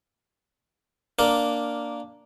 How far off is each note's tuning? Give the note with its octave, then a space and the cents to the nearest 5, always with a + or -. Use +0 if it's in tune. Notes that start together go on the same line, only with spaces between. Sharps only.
A#3 +0 D4 +0 A#4 +0